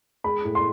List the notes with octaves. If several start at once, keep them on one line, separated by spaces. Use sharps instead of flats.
G#3 B5
A2
C6